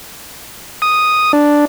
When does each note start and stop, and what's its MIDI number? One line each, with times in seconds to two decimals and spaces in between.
0.82 1.32 87
1.33 1.65 62